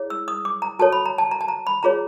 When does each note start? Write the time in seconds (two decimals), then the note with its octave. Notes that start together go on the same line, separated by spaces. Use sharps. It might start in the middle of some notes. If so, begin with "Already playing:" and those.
Already playing: E4 G#4 C#5
0.10 E6
0.28 D#6
0.45 D6
0.62 A#5
0.79 F#4 A4 C#5 A5
0.92 B5
1.06 A#5
1.18 A5
1.31 A#5
1.41 A5
1.48 A#5
1.67 B5
1.83 F4 G#4 C#5 A#5